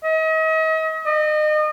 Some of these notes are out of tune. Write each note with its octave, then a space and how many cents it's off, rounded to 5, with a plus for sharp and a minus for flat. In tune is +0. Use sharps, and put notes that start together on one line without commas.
D#5 +40
D#5 -30